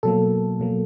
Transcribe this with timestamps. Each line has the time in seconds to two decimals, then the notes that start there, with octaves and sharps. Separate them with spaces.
0.03 B2 F#3 A#3 A4
0.60 B2 F#3 A#3